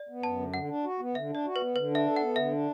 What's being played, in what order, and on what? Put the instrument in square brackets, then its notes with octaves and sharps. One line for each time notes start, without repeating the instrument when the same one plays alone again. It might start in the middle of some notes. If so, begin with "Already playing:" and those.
Already playing: [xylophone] D5
[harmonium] B3
[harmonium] F#2 [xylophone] A5
[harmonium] D3
[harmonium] D3 [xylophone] F#5
[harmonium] D4
F#4
B3
[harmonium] D3 [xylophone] E5
[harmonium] D4 [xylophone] D5
[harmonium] F#4
[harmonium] B3 [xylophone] B4
[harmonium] D3 [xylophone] B4
[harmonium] D4 [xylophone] E5
[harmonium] A4
[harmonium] B3 [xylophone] F#5
[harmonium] D3 [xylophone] E5
[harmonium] D4